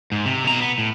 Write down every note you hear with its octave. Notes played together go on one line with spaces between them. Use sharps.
G#2
C3
B2 A#5
B3
A2